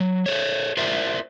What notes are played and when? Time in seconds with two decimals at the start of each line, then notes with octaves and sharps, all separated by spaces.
0.01 F#3
0.26 A4 C5 C#5
0.77 F4 A#4 C5 D5 E5